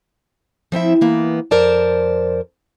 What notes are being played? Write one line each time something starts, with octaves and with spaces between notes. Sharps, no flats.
F3 C4 E4 E5
E3 A#3 B3
F2 A#4 C5 D5 A5